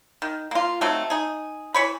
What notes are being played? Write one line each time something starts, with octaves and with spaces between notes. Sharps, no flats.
D#3
A#3 F4
F#3 A3 C4 D#4
D#4 G#4
E3 C#5 B5